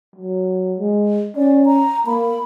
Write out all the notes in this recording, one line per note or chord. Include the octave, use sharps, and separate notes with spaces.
F#3
G#3
C#4 D5
A#5
A#3 B5